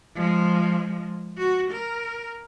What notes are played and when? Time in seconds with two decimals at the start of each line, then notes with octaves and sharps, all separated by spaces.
0.15 F3 G#3
1.38 F#4
1.71 A#4